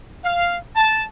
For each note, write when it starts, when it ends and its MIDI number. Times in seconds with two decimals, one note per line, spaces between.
0.24 0.56 77
0.75 1.04 81